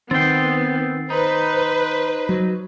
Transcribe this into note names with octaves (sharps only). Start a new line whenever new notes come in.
D#3 B3 C4 G5 A6 C7
D#4 B4 C5
F#3